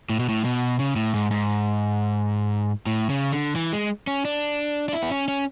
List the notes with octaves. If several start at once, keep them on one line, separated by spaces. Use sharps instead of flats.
A2
B2
A2
B2
C#3
A2
G#2
G#2
A2
C#3
D3
E3
G#3
C#4
D4
D4
E4
B3
C#4
C#4